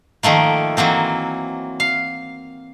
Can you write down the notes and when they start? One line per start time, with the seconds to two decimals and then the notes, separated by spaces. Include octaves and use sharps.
0.23 D#3 F3 A3 A#3
0.77 E3 F#3 A#3 C4
1.80 F5